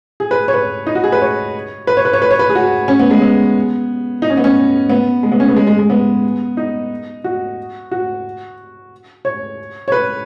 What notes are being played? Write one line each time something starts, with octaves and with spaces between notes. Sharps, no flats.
G#4
B4
C#5
B4
D#4
F#4
G#4
B4
C#5
B4
C#5
B4
C#5
B4
C#5
B4
G#4
F#4
C#4
B3
G#3
B3
D#4
C#4
B3
C#4
B3
G#3
B3
C#4
B3
G#3
G#3
G#3
B3
D#4
F#4
F#4
C#5
C#5
B4